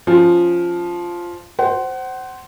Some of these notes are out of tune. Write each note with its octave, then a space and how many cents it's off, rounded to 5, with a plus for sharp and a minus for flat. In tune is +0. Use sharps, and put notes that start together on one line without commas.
F3 +0 C#4 +0
C5 +0 F#5 +30